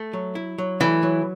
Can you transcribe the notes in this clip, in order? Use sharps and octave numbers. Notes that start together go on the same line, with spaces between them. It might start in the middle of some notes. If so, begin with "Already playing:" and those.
Already playing: A3
F#3
E4
F#3
E3 A3
F#3